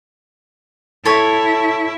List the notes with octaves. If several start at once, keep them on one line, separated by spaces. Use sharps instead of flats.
E4 A4 C#5